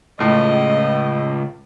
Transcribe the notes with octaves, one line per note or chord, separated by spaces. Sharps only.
C#2 A2 D#5